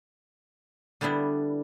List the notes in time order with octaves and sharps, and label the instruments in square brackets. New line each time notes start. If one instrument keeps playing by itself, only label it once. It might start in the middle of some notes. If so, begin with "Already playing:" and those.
[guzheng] D3 G3 B3 D4 E4